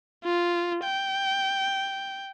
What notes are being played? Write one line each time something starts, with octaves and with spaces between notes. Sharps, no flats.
F4
G5